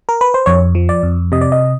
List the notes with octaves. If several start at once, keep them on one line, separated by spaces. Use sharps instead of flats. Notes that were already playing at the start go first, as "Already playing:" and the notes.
A#4
B4
C5
F2 C#5
F3
D5
F2
C3 D#5
D5
D#5